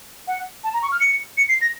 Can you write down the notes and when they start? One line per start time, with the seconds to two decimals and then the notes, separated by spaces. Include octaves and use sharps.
0.28 F#5
0.64 A5
0.73 A#5
0.83 C#6
0.92 F6
1.00 C#7
1.38 C#7
1.49 C7
1.61 A#6